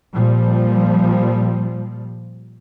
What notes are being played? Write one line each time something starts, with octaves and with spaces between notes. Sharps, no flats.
A#2 F3 G3